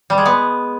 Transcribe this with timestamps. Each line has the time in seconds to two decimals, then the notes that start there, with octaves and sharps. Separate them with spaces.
0.10 G3
0.18 G#3
0.25 B3